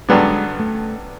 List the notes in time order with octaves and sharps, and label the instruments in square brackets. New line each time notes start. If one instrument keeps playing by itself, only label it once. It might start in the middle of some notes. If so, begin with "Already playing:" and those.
[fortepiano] G2 D3 F#3 B3 D4 [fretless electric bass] G#3
[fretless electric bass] A3